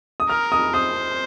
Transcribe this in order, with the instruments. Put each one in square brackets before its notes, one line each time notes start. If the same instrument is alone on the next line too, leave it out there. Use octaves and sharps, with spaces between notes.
[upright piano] D#6
[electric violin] A#4 [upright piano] F6
[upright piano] D#6
[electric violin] C5 [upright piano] D#6